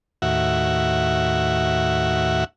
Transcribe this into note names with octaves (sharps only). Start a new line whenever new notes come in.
D#2 A2 F#4 E5 F#5